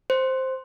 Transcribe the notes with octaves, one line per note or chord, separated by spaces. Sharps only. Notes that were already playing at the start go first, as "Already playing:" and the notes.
C5